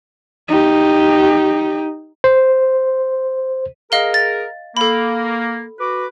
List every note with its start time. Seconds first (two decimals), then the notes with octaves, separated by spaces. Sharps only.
0.49 D#4 G4
2.24 C5
3.92 G#4 A#4 D#5 F5 G7
4.14 A6
4.77 A#3 A4 B5
5.80 F#4 B4 D6